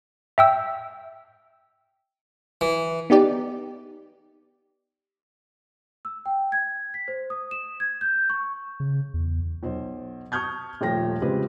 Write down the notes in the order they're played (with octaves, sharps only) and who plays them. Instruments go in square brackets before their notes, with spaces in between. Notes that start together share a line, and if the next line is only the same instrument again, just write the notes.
[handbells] E5 G5 E6
[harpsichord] E3
[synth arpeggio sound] B3 D#4 G4 D5
[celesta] E6
G5
G#6
B6
C5
D#6
E7
G#6
G6
C#6
[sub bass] C#3
E2
[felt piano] B1 C5
A5 C#6 D#6 F6 G6 G#6
D#1 F3 A3 G5 A#6
C#3 G#3 C4 F4 G4 B4